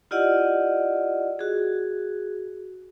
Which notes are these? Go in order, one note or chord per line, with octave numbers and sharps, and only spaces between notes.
E4 F4 G4 D5 D#5 F#5
F#4 G#4